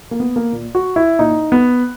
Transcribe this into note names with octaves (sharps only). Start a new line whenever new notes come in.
A#3
B3
A#3
A#2
F#4
E4
A#2 D#4
B3